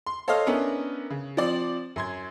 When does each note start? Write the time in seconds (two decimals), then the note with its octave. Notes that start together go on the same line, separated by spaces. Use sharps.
0.07 C6
0.28 A4 C5 C#5 D#5 F5
0.46 B3 C#4 D4 E4 A#4
1.10 C#3
1.37 F3 C4 D5 F#7
1.96 F#2 C6 G#6